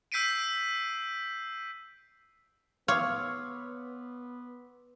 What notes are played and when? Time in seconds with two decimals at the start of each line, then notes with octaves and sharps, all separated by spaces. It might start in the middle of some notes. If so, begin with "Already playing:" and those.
0.12 E6 G6 B6 C7 D7 D#7
2.88 B3 C#5 F5 C6 D6 E6